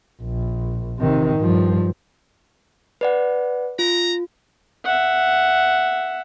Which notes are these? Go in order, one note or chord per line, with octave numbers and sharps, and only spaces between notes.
A#1
C3 D#3
G2 F3
B4 D5 F#5
F4 A#5
E5 F#5